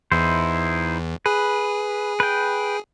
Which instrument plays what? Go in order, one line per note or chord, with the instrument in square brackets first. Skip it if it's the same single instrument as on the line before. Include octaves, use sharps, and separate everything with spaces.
[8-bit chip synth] E2 [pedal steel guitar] D#4 E4 C5
[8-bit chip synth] G#4 [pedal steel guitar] B4
[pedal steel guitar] B4 G5